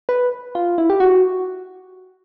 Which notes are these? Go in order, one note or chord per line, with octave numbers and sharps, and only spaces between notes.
B4
F4
E4
G4
F#4